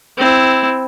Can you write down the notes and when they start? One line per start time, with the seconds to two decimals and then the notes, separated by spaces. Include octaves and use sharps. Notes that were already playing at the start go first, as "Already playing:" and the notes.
0.17 C4 E4